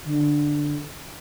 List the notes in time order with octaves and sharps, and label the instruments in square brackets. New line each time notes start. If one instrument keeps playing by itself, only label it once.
[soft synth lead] D3